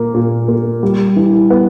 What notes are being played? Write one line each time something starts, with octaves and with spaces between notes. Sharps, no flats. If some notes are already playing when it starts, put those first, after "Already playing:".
Already playing: A#2 A#3
A#2
A#3
G3
E3
B3